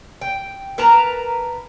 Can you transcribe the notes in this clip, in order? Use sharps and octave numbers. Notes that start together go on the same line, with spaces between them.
G5
A#4 B4 A5 A#5